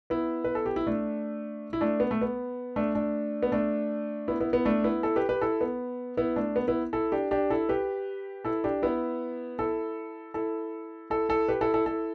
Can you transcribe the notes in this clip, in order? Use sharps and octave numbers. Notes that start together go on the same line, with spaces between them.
B3 E4
B4
A4
G4
E4
A3 D4
E4
A3 D4
B3
A3
B3
A3 D4
A3 D4
B3
A3 D4
B3 E4
B3 E4
B3 E4
A3 D4
B3 E4
E4 A4
G4 B4
G4 B4
E4 A4
B3
B3 E4
A3 D4
B3
B3 E4
E4 A4
D4 G4
D4 G4
E4 A4
G4 B4
E4 A4
D4 G4
B3 E4
E4 A4
E4 A4
E4 A4
E4 A4
G4 B4
E4 A4
E4 A4
E4 A4